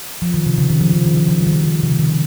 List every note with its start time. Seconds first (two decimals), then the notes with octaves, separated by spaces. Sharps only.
0.22 F3
0.34 D#3
0.46 C3
0.58 C#3
0.70 D#3
0.81 F3
0.93 C#3
1.06 D#3
1.17 F3
1.28 F3
1.40 G3
1.47 D#3
1.52 F3
1.64 D#3
1.83 C3
1.92 C#3
1.99 D#3